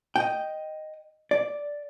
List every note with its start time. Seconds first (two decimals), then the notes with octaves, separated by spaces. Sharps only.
0.16 D#5 G5
1.31 D5